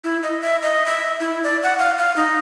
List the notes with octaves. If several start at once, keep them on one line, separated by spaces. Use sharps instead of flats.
E4
D#5
E5
D#5
E5
E4
D5
F#5
F5
F5
D#4